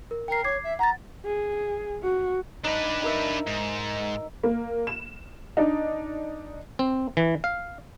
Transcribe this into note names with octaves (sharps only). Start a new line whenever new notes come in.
A#4
A#4 G5 C7
C#5 D6 G#6 C7
E5
F#5 A#5 A6
G#4
F#4
D4 D#4 B4
D#4 A#4 E5
G#2
A#3
E7
D4 D#4
C4
E3
F5